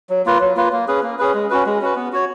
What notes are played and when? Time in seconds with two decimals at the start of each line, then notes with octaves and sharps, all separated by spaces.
0.10 F#3
0.26 A#3 F4 B4
0.40 F#3
0.56 A#3 F4 B4
0.72 A#3
0.88 C#4 G#4 B4
1.03 A#3
1.19 C#4 G#4 B4
1.34 G#3
1.50 C#4 F#4 B4
1.66 G#3
1.81 C#4 F#4 B4
1.96 B3
2.13 F#4 C#5